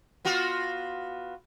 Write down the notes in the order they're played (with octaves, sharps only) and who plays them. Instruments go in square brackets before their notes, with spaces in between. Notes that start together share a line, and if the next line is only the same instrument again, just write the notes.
[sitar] B3 F4 F#4